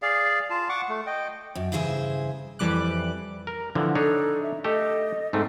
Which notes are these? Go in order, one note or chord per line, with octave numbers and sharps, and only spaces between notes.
G#4 D5 F5
F4 A5
F#5 C#6 D6
A3
D#5 G5
F#2
G2 C#3 E3 G#4 C5 E5
F2 E3 G3 D6 F#6
A#4
D3 E3 F3 F#5
D4 D#4 A4 C#5
E5
A3 G4 A4 D#5
G#2 A3 C4 D#4